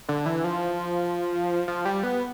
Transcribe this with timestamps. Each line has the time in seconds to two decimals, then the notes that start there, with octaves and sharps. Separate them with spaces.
0.09 D3
0.26 E3
0.44 F3
1.68 F3
1.85 G3
2.03 B3